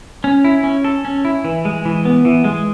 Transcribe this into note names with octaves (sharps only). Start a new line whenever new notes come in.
C#4
E4
C#4
A4
C#4
E4
E3
G#3
E3
B3
E3
G#3